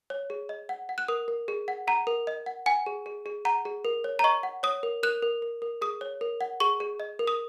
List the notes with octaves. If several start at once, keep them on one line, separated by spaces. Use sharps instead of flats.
C#5
G#4
D#5
F#5
F#5
F#6
A#4 D#6
A#4
G#4
F#5
F#5 A#5
A#4
D#5
F#5
F#5 G#5
G#4
G#4
G#4
F#5 A#5
G#4
A#4
C#5
A#5
D#5 C#6
F#5
C#5 D#6
A#4
A#4 F#6
A#4
A#4
A#4
G#4 D#6
C#5
A#4
F#5
G#4 C#6
G#4
D#5
A#4
D#6